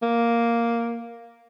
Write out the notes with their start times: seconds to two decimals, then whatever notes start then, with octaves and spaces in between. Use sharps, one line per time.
0.02 A#3